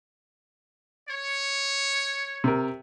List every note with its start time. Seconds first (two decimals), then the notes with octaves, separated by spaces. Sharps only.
1.09 C#5
2.44 C3 A#4